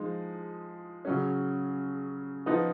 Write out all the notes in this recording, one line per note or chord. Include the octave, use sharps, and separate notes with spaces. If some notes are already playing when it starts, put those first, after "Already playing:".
Already playing: F3 G#3 D#4
C#3 F#3 C#4
F3 B3 D#4